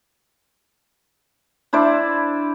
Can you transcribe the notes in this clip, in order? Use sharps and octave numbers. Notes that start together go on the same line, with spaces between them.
D4 E4 C5 D5